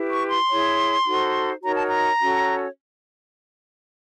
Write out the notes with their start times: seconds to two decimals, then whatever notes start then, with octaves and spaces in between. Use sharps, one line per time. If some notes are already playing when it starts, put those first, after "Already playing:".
Already playing: E4 G4 B4
0.10 C#6
0.29 C6
0.48 E4 G#4 C#5
1.06 D#4 F#4 A4 C5
1.63 D#4 F#4 A#4 C#5 A#5
1.76 A5
1.87 A#5
2.21 C#4 F#4 A4 C#5